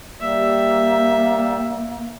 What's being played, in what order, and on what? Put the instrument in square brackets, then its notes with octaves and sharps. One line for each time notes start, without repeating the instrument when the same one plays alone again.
[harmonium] G3 [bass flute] A#3 [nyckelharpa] E5